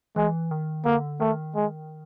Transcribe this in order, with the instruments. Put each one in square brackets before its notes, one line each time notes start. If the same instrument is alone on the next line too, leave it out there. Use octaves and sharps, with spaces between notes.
[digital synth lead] E3 [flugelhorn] G#3
[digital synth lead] D#3
[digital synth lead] D3 [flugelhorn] A#3
[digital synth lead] D#3 [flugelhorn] A3
[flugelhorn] G#3